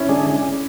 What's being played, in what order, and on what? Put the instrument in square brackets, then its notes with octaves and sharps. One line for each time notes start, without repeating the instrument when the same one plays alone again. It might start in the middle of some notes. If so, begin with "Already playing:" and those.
Already playing: [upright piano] C#4 E4
[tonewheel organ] D3 G#3 D4 G#4